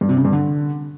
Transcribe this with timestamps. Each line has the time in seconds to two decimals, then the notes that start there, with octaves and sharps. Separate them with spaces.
0.01 G2
0.09 C3
0.17 C#3
0.25 G2
0.33 D3